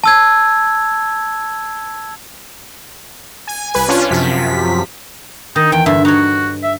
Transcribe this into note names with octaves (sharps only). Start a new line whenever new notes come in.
A5 E6 G#6
G#5
C2 B4 G#5
C#4 D4 F4
F#2 C3 F3 B6
D#3 D#4
E2 G5
G2 D3 E5 C6
D#4 F#4 C#5
E5